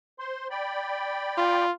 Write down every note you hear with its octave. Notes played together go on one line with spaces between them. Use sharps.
C5 C6
D5 G5 B5
F4